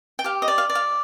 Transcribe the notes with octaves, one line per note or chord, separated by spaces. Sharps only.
G5
G4 F5
D#5
D5
F5
D5
F5